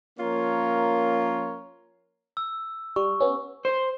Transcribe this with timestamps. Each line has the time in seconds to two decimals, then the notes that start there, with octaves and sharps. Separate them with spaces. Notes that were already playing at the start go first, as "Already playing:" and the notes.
0.19 F3 A#3 C#4 F4 A#4 C#5
2.37 E6
2.96 G3 C#6
3.20 B3 C#4
3.65 C5